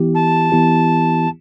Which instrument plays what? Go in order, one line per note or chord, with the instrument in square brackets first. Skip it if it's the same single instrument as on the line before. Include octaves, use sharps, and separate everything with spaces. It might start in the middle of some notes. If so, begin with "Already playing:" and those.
Already playing: [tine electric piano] E3 B3 E4 G4
[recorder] A5
[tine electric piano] E3 B3 E4 G4